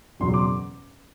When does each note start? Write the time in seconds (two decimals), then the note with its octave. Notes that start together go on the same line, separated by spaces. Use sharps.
0.20 F#1 E2 B2 F#3 C6
0.34 D6